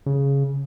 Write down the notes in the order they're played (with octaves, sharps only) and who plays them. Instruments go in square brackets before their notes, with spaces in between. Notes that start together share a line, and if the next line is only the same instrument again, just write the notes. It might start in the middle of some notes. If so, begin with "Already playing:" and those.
[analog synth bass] C#3